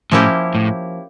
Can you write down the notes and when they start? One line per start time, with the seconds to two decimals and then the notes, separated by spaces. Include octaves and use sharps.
0.11 A2 F3 A#3 C#4 E4 G4
0.55 A2